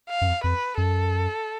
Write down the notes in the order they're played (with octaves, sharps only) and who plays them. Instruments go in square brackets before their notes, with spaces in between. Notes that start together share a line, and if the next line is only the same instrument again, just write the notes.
[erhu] F5
[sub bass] F#2
F2
[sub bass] F2 [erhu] B4
[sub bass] F#2 [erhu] A4